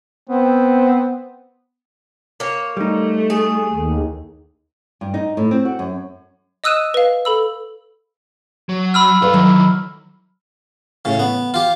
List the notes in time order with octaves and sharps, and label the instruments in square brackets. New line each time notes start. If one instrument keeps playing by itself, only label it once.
[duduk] B3 [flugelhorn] C4
[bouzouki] A#3 C#5
[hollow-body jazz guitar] G3 D#4 [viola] A3
[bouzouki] G#4
[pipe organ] D#2
[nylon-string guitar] G2
D#4
A2
C4
F#4
F#2
[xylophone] D#5 D#6 E6 F#6 D#7 E7
B4 F5
A4 B5 E6
[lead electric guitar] F#3
[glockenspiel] B5 E6 F6
[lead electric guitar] E4 F5 [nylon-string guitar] A4 B4 D5
[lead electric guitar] D#3 E3 [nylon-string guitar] F#3
[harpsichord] A2 C#3
B3
F4 G4